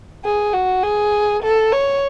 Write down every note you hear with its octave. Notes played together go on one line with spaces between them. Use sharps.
G#4
F#4
G#4
A4
C#5